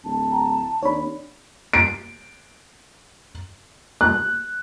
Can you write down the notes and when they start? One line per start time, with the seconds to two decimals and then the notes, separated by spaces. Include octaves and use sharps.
0.04 D1 A5
0.32 G5 A#5
0.83 D#2 C4 D4 C#5 D5 B5
1.73 D7
4.01 F#6